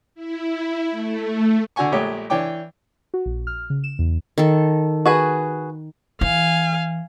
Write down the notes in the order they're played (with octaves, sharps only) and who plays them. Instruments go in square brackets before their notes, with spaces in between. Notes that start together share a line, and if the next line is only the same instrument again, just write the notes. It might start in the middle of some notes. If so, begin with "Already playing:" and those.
[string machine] E4
A3
[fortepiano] D3 F#4 F#5 G#5 C#6
A#1 A#2 G#3 A3 G4 C#5
E3 D4 C#5 G5 D6
[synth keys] F#4
A#1
F6
C#3
E7
E2
[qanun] D#3 A4
[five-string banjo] F#4 G#4 B4
[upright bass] E3 [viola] F5 G#5